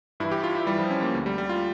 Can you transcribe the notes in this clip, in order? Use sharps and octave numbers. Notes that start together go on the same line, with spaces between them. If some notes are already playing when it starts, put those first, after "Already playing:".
G2 E3 E4
G4
F4
E4
G2 E3 G3
F3
C#4
A#3
D2 D3
G3
G3
F4